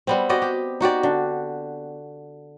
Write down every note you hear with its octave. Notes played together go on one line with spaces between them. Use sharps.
G3 B3 C4
F#4 G4 D5 D#5
G4
D#4 F#4 G4 D5
D3